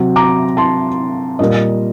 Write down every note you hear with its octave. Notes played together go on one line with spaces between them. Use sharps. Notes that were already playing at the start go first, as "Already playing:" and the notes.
Already playing: C3 F#3 C4
A#5 D6
A5 C6
A#2 G3 A#3 D#5